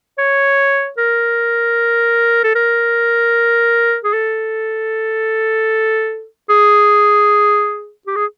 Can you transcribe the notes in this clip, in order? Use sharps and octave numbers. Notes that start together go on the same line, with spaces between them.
C#5
A#4
A4
A#4
G#4
A4
G#4
G4
G#4